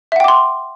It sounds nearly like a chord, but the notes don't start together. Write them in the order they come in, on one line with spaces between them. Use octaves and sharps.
E5 F#5 G5 D6 C6